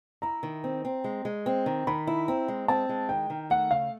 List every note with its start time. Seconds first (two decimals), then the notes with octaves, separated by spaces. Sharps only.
0.22 E4 A#5
0.43 D#3
0.64 C4
0.85 C4
1.04 G#3
1.25 G#3
1.46 C4
1.66 D#3
1.87 D#3 B5
2.07 E4
2.28 C4 A#5
2.48 G#3
2.68 C4 A5
2.89 G#3
3.09 D#3 G5
3.30 D#3
3.50 A3 F#5
3.71 C#3 F5